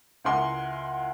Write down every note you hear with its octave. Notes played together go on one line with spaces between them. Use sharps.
C#2 E4 A#4 F#5 G#5 C6